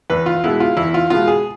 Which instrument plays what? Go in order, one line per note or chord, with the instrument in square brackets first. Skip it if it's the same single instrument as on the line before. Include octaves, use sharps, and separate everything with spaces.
[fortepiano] E2 B4
F4
B2 G#3 B3 E4
F4
E2 E4
F4
B2 G#3 B3 F4
G#4